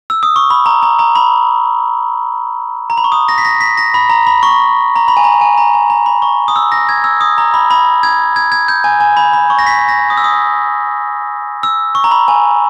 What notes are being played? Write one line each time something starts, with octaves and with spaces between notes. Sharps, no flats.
E6
D#6
C#6
B5
A#5
A#5
A#5
B5
A#5
B5
C#6
D#6
A#6
B6
A#6
B6
A#6
B5
A#5
B5
C#6
A#5
B5
G#5
A#5
G#5
A#5
G#5
A#5
B5
C#6
D#6
E6
A#6
G#6
E6
D#6
A#5
B5
B5
G#6
G#6
G#6
G6
G#5
G#5
B5
B5
C#6
A#6
B6
A#6
D#6
E6
D#6
E6
C#6
A#5
B5
G#5